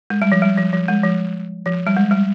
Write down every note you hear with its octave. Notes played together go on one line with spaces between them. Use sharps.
G#3
G3
F3
G3
F3
F3
G#3
F3
F3
G3
G#3
G3